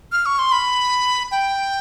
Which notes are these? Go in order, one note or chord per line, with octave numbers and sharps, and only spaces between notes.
F6
C#6
C6
B5
G5